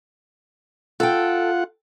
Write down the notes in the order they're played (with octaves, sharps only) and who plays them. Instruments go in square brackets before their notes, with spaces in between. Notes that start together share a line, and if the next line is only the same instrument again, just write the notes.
[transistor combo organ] F4 F#5 [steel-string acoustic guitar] A4 G5